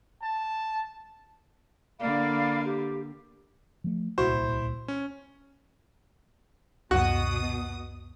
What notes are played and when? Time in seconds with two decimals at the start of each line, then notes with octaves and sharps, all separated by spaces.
0.22 A5
1.99 D3 A#3 D5 F5 B5
2.64 G4
3.84 F3 A3
4.18 D1 C2 A#2 E4 F#4 C5
4.88 C#4
6.91 C#2 F#2 B2 F#4 D#6